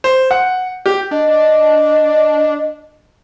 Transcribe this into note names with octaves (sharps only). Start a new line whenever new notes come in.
C5
F#5
G4
D4 D#5